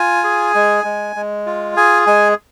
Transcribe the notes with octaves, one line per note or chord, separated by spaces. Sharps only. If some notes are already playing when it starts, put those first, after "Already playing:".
Already playing: F4 G#5
G#4
G#3
G#3
G#3
F4
G#4 G#5
G#3 G#5